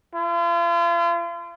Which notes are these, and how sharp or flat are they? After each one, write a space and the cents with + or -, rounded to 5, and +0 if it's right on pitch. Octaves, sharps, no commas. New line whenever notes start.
F4 -40